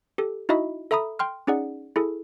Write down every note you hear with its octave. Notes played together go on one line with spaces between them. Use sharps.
G4 A4
D#4 E4 F#4 D#5 E5 B5
A4 E5 A#5 B5 D#6
G5 C6 F6
C#4 D#4 G#4 D5 F#5
E4 G#4 A4